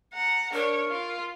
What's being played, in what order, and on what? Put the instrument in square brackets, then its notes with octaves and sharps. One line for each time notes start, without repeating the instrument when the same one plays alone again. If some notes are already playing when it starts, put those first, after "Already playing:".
[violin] F#5 A#5
[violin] D4 C#5 [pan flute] A#4
[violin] F4